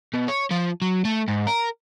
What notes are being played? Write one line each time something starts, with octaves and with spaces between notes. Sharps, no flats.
B2
C#5
F3
F#3
A3
G#2
A#4